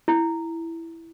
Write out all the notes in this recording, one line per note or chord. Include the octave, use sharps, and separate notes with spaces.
E4